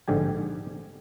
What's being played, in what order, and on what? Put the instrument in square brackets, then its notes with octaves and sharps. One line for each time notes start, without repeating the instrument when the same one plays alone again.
[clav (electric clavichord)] A#1 G#2 D3 G4 G#5